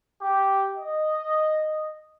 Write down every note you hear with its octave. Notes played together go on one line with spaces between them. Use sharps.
G4
D#5